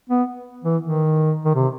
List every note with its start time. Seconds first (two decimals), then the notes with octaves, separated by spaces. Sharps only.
0.10 B3
0.64 E3
0.82 D#3
1.45 D#3
1.55 C3